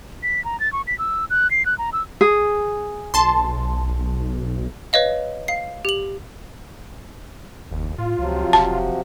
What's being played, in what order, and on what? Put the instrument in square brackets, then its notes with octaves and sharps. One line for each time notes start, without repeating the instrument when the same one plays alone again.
[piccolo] B6
A#5
A6
C#6
B6
E6
F#6
C7
F#6
A#5
E6
[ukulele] G#4
[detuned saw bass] B1 [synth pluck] A5 C6
[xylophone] B4 C#5 D#5 F5
F5 C7
G4 F#7
[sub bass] F#1 [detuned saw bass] D#2
[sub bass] A2 [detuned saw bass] F4
[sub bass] C#2 [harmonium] C3 F3 F#3
[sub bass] E1 [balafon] A5